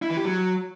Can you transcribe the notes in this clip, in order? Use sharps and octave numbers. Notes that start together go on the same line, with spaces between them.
E4
E3
G4
F#3